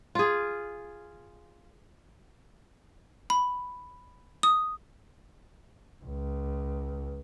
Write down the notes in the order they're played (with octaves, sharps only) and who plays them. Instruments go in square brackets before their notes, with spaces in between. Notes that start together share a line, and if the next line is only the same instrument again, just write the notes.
[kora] F4 G#4
[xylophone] B5
D#6
[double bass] C#2